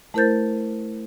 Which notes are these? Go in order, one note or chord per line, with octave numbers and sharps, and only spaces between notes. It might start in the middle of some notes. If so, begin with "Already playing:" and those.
A3 E4 A#4 C5 G6 A6